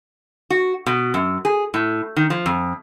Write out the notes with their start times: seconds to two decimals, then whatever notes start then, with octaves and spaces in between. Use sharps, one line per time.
0.50 F#4
0.86 B2
1.14 F#2
1.45 G#4
1.74 A2
2.16 D#3
2.30 F3
2.46 F2